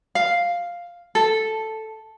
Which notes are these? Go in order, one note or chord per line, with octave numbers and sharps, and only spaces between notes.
F5
A4